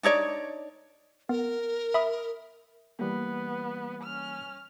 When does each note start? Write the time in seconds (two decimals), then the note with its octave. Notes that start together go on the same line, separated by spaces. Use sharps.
0.03 D4 D#4 C#5 D5
1.29 B3 A#4
1.94 E5 B5 D#6
2.99 E3 G3 A#3 B3
4.03 C#4 F6